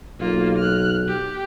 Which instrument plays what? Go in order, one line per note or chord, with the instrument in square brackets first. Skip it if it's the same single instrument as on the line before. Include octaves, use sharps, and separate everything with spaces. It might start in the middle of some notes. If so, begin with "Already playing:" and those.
[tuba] B1 [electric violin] A#3 F4
[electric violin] F6 F#6
G4